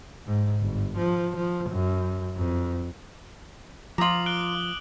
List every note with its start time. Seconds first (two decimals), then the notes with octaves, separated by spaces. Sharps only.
0.26 G#2
0.61 G1
0.98 F3
1.36 F3
1.70 F#2
2.37 F2
3.98 F3 F4 A#5 D6 D#6 F#7
4.26 F#6 D7 G7